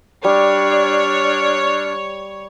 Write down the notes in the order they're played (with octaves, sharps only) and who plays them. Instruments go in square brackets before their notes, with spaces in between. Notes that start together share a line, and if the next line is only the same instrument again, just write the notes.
[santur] G3 [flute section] D4 F6 [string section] C#5